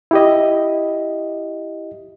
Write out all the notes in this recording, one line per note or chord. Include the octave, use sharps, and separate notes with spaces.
E4 G4 D#5